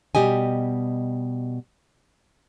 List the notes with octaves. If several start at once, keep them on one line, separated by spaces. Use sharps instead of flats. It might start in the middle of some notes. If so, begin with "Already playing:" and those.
B2 G3 G4 D#5 G#5